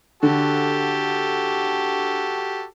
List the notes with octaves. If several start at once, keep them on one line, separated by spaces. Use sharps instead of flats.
D3 F#4 G4 A4